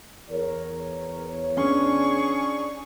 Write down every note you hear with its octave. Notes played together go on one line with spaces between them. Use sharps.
E2 A#4 C#5
C#4 D4 G#4 C#6